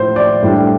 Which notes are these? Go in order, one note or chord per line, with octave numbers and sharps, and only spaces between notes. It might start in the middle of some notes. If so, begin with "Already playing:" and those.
Already playing: A2 F3 C5
D5
A2 G3 D4